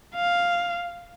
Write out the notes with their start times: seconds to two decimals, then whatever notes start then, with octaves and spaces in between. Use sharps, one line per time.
0.15 F5